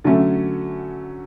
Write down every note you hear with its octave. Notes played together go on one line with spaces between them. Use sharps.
D3 F#3 A3 C#4